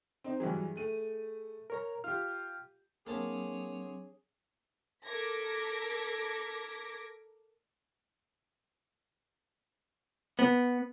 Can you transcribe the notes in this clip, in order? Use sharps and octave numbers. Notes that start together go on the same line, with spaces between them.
C4 D#4
G2 E3 F#3 G#4
A3 D#7
A#4 C#5 A#5
F4 G4 F6
F#3 A#3 C4 D4 G#4 C#5 A5
A4 A#4 D6 G#6 A#6 B6
B3